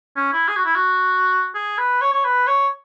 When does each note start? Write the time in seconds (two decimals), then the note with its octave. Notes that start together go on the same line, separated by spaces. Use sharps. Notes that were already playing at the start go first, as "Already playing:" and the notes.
0.17 C#4
0.33 E4
0.48 G#4
0.56 F#4
0.65 E4
0.75 F#4
1.55 G#4
1.78 B4
2.01 C#5
2.13 C#5
2.25 B4
2.47 C#5